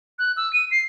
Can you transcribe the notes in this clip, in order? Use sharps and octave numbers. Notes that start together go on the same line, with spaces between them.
F#6
E6
D#7
C7